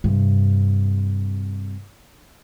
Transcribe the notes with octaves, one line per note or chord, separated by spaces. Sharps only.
G2 C3